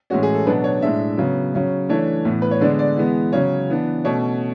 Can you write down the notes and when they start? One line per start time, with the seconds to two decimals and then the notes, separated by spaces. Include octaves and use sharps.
0.10 A2 E3 G#3 C#4 F#4
0.23 G#4
0.35 A4
0.47 B2 F#3 B3 D4 B4
0.64 C#5
0.82 A2 G#3 D4 E5
1.18 C#3 F#3 B3
1.54 C#3 F#3 C#4
1.89 E3 A3 D4 C#5
2.25 A2 E3 B3
2.42 B4
2.51 C#5
2.61 D3 G#3 B3 D4 D5
2.79 D5
2.97 E3 G#3 B3
3.32 C#3 F#3 C#4 C#5
3.69 E3 B3 D4
4.04 B2 A3 C#4 C#5